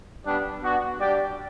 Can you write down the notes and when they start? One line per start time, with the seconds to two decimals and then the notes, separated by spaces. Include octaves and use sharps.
0.25 G3 B3 D4
0.63 B3 D4 F#4
1.00 G3 D4 G4 D5 G5